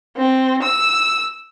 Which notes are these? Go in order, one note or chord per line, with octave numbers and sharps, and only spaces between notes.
C4
E6